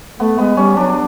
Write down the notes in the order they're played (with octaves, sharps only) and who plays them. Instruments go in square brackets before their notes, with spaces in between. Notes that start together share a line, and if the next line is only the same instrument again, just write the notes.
[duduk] A3 [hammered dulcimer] B3
[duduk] G#3 [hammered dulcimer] B3
[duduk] G3 [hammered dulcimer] C#4
[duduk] F#3 [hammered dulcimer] D4